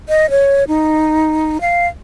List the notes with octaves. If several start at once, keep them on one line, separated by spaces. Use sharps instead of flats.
D#5
C#5
D#4
F5